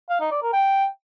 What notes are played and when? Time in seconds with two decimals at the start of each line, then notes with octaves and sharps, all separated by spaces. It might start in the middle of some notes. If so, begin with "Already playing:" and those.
0.10 F5
0.20 D#4
0.31 D5
0.42 A#4
0.53 G5